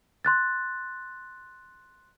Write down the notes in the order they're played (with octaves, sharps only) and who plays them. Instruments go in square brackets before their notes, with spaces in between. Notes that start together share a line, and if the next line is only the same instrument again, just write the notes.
[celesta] C6 F#6 A6